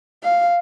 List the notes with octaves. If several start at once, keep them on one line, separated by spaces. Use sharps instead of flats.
F5